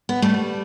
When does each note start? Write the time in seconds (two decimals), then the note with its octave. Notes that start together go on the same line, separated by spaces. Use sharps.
0.09 B3
0.22 G3 A3